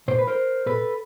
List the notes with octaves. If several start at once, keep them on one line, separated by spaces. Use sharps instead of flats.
A#2 C5
B4
A#4 C5
A#2 A4 B4